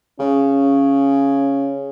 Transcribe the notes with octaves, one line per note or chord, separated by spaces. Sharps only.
C#3 C#4